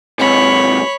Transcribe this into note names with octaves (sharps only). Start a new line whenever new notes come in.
G#2 C3 C#5 B5